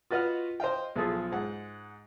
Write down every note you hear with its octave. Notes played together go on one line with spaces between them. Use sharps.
F4 F#4 B4 D#5 F#5 F6
C5 D#5 F5 G5
B1 F3 F4 G#4 A4
G#2 F#5